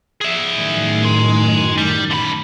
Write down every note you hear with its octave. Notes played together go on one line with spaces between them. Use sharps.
G#4 E5
F#2 A2 D#3
G#5 C6
G3
D3 B5